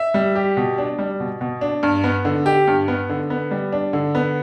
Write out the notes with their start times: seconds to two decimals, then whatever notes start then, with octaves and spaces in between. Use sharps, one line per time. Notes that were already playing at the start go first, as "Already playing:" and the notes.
Already playing: E5
0.14 G3
0.35 G4
0.57 B2
0.78 D4
0.99 G3
1.20 B2
1.41 B2
1.61 D4
1.83 G2
2.04 B3
2.25 D3
2.46 G4
2.68 G2
2.88 B3
3.09 D3
3.30 B3
3.51 G3
3.72 D4
3.93 D3
4.15 B3